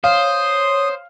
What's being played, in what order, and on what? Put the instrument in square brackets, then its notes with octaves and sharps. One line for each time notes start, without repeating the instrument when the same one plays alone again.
[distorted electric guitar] C5 [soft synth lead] C#5 [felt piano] F5 [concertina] D#6